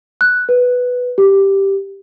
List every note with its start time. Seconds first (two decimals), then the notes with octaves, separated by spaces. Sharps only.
0.21 F#6
0.49 B4
1.18 G4